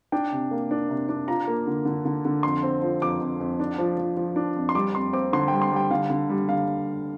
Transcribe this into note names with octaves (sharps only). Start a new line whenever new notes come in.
D4 G5
C3
A#3
D4
C3
D4
F4 A#5
A#3
D3
D3
D3
D3
F2 C6
C4
F3
F2 D6
F2
F2
D4
F3
F3
F3
D4
F2
C6
G3 D6
F2 C6
C4 D6
D3 C6
G3 G5
C6
G3 G5
D3 F5
D3
G3
D3 F5